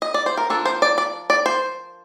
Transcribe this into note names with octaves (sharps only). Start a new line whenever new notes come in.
D#5
D5
C5
A#4
F3 A#3 D4 A4
C5
D5
D5
D5
C5